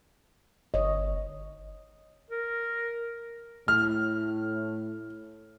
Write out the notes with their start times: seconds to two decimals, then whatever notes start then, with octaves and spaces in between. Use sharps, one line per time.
0.74 G1 C#5 D#5
2.30 A#4
3.68 A2 F6